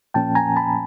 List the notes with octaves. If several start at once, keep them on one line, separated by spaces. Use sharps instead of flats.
A#2 F3 A#3 C#4 G5 A5
G#5 A#5
A5 B5